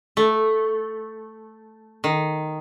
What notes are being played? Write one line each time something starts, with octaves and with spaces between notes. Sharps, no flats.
A3
D#3